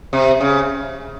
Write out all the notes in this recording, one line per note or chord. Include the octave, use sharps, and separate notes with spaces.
C3
C#3